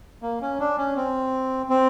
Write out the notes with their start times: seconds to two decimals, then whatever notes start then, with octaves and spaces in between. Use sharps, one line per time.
0.22 A#3
0.42 C#4
0.60 D4
0.78 C#4
0.96 C4
1.70 C4